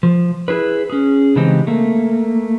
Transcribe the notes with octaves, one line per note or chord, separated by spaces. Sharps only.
F3
E4 G#4 B4
C#4 G#4
C#3 E3 G#3 C4 D#4 G4
A3 A#3